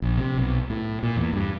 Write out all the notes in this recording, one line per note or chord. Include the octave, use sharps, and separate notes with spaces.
A#1
C3
B1
A2
A#2
E2
G2